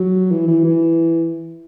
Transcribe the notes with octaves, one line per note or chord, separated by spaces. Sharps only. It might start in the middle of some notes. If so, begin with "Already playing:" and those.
Already playing: F#3
E3
E3
E3